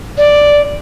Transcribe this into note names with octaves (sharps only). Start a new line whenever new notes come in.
D5